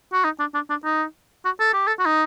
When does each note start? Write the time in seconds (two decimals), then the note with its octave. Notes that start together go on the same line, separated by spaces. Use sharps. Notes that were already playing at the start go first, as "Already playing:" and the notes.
0.13 F#4
0.24 D#4
0.39 D4
0.54 D4
0.70 D4
0.85 D#4
1.45 F#4
1.60 A4
1.73 G4
1.87 A4
1.99 F#4
2.06 D#4